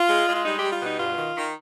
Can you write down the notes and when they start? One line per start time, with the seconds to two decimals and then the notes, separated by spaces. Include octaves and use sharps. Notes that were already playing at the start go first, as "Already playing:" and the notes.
Already playing: F4
0.08 G#3
0.27 G#3
0.35 F4
0.45 G3 D#4
0.59 G3 G4
0.72 F4
0.81 B2 D#4
0.99 G2 F4
1.17 D#3
1.36 D#3